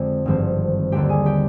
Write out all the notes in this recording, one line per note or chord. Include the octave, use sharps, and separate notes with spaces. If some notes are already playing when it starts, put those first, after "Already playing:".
Already playing: F2 D3 G#3 C4 G4 G5
G#1 G2 F3 C4
D#2 D3 G3 C4 G4 G5
G#4 G#5
G4 G5